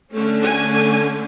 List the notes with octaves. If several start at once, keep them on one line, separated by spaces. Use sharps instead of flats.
D3 A3 C#4
G#5